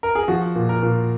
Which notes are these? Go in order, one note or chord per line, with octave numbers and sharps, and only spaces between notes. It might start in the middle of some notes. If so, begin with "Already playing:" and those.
A#4
G#4
F3 F#4
A#2
A#4
A#2